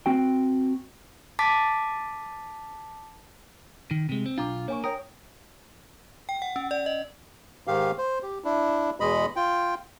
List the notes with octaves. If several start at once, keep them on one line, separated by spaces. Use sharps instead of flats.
C4 F#4 G5
A5 D6 A6 B6
D#3
C3 G#3
C4
B1 D4 F4 A#5 D6
A#3 C#5 G#5 C#6
A#4 C#5 G5 D#6
G5
F#5
C#4
D5
D#5
G#2 D#3 G4 F5
C5
G4
D4 E4
E2 B2 G#3 D#5 B5
F4 G5